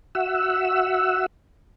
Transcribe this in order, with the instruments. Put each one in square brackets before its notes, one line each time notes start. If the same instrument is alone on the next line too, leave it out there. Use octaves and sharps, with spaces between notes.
[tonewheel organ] F#4 E5 F#5 E6